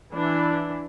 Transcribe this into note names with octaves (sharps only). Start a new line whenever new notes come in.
E3 D4 E4